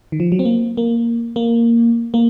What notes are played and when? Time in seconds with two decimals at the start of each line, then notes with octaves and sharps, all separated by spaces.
0.12 D#3
0.20 F3
0.32 F#3
0.39 C4
0.45 A#3
0.77 A#3
1.36 A#3
2.14 A#3